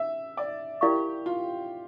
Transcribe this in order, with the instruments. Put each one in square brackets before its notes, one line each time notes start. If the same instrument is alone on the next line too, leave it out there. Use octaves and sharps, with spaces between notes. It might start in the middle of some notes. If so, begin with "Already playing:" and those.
Already playing: [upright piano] E5
D5
[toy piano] E4 A#4 D5 F5 C#6 [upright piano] G4
[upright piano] F4